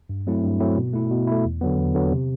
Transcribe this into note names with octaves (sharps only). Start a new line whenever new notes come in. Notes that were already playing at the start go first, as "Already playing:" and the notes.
G2
F#3 A3 C4 E4
G2
F#3 A3 C4 E4
B2
A3 E4
B2
A3 E4
E2
D3 F#3 B3
E2
D3 F#3 B3
C3